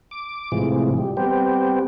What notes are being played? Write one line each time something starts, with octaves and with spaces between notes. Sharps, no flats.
D6
A2 C3 E3 F3 G#3
G3
G3 B3 C4 G4